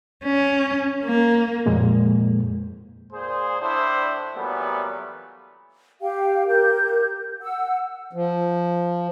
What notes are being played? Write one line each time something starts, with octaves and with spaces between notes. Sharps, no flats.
C#4
A#3
F2 A#2 G#3 A#3
A#2 G#4 C5
A2 D4 E4 C5
A#2 E3 F#3 G3 A3 B3
G4 F5 G5
G4 A#4 G6
F#5 E6
F3